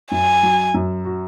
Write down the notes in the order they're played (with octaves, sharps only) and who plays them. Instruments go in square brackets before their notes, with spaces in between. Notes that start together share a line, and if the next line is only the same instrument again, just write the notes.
[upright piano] F#2 [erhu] G#5
[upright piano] F#3
F#2
F#4